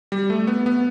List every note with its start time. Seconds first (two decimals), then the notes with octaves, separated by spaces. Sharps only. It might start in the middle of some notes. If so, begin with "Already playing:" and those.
0.12 G3
0.30 A3
0.47 B3
0.66 B3